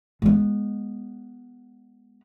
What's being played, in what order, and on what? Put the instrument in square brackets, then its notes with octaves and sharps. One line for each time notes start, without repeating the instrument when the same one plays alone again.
[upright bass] G#3 B3